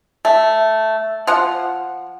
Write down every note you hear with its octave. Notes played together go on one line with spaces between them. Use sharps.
A3
F3 F#5